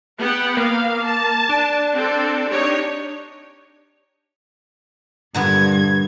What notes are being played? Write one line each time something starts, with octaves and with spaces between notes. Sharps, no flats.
B3 F#5 G5
A#3 F5
A5
D4
C4 A4
D#4 G4 C#5
G2 A#2 D3 B3 G#6